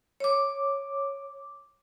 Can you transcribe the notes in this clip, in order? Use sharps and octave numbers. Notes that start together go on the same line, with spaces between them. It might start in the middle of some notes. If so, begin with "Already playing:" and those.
C#5 D6